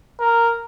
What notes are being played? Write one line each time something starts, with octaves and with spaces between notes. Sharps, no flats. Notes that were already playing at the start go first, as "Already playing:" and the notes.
A#4